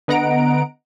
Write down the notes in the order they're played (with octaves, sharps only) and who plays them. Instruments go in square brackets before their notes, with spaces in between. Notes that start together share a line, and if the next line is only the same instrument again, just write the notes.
[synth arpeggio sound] D3 B3 D#5 F#5 A#5 D7